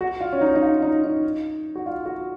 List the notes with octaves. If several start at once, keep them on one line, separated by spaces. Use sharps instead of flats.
F#4
F4
C#4
D#4
D#4
F4
D#4
D#4
F#4
F4
F#4